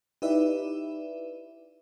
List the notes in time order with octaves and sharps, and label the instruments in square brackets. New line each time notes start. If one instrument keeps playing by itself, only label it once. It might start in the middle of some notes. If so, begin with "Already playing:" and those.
[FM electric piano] D#4 E4 G4 B4 D5 E5